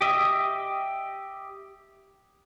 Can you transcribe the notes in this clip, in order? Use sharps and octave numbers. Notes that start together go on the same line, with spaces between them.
G4 D#5 E5